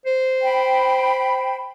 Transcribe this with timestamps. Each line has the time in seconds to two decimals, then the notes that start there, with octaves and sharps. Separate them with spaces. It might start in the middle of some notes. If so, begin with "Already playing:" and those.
0.05 C5
0.42 G5 B5